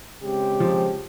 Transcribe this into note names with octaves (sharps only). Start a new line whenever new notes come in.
C#3 G#3 C4 G4
F3